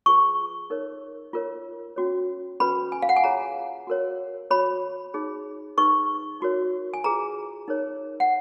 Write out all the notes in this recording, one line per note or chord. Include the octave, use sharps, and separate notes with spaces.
F4 G#4 B4 C#6
D#4 A#4 C#5
F4 A#4 C#5
C#4 F#4 C#5
C#4 F#4 B4 B5
G#5
F5
F#5
G#5
F4 G#4 C#5 A#5
F#4 A#4 C#5
F#4 C#5 B5
D#4 G#4 C#5
D#4 G#4 B4 C#6
D#4 F#4 A#4 C#5
G#5
F4 G#4 B4 A#5
D#4 A#4 C#5
F#5